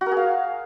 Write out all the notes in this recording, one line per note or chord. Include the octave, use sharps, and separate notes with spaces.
F#4
A#4
G#4
F5